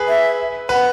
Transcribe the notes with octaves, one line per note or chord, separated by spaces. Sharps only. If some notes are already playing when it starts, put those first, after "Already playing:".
Already playing: G#4 B4
E5
B4 F#5